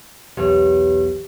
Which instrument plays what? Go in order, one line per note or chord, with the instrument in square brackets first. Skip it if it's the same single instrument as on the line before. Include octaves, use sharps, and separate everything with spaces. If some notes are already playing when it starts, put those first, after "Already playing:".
[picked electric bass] B1 E2 [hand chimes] G4 B4 C#5